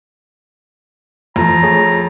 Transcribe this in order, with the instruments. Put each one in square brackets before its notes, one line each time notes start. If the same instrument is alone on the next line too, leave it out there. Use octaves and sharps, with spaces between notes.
[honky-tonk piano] F2 [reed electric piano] E3 A3 [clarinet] A#5
[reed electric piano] A3 G#4 C#5